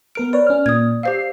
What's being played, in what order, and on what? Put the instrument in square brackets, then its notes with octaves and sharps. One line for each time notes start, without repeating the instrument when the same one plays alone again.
[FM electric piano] B3 A#4 F6 [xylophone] D7
[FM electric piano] B4 C#5 [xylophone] D5
[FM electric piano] C#4 F6
[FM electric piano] A#2 [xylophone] D#6 G#6
[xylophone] G4 C5 F5 [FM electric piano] E6 C7